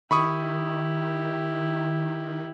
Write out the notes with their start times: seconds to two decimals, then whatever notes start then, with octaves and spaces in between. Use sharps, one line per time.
0.11 D#3 E4 G4 B5 C#6 D#6